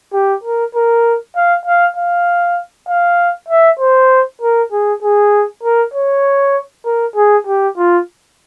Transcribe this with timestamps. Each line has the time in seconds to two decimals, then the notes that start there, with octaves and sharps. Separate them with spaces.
0.13 G4
0.44 A#4
0.75 A#4
1.36 F5
1.66 F5
1.96 F5
2.88 F5
3.49 E5
3.80 C5
4.42 A#4
4.72 G#4
5.03 G#4
5.63 A#4
5.94 C#5
6.85 A#4
7.16 G#4
7.47 G4
7.77 F4